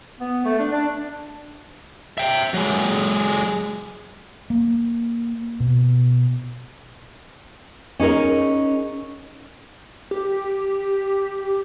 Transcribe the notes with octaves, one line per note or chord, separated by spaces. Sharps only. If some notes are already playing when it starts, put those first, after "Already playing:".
B3
A3
D4
D4
E5 G5
F#3 G#3
A#3
B2
C#4 D#4 G#4 A#4
G4